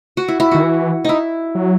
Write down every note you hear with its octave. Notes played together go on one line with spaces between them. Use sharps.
F#4
E4
E4
D#3 F#4
E3
D#4 E4
F#3